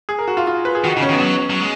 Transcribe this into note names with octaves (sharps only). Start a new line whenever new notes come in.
G#4
A#4
F#4
F4
F4
B4
G#4
D#3 F#4
C#3 D#4
C#4
D#3
B3
F3
F#3
F#3
G#3